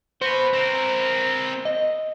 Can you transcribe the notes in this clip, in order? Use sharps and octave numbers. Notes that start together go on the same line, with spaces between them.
F#4 B4 C5
C4 A#4
D#5